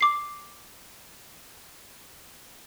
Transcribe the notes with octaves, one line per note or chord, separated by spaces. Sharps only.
D6 C7